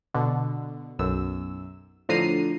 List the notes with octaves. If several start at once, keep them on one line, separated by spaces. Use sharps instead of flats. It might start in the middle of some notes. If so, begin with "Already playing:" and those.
B2 D3
B1 F#2 E6
A2 D3 F3 A#5 C7 D#7